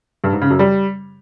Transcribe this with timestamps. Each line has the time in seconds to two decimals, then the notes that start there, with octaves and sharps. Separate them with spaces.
0.24 G2
0.33 G#2
0.41 C#3
0.50 F#2
0.59 G3